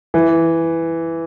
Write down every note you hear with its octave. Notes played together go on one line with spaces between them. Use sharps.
E3